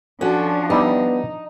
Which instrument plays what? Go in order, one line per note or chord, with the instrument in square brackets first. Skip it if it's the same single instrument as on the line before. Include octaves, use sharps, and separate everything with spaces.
[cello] F3 D4 [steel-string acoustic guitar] C#4 F#4 [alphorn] A4
[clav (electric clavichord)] G3 E4 [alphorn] B3 [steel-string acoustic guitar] D#4